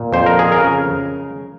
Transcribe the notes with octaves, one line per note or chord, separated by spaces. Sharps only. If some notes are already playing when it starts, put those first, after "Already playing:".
Already playing: A#2
F2 C5
A#4
G#4
A#4
C#3